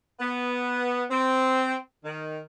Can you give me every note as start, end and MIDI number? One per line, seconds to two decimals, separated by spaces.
0.20 1.03 59
1.10 1.75 60
2.04 2.38 51